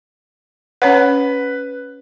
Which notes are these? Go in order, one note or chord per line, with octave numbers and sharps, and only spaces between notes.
C#4 B4 C#5 F#5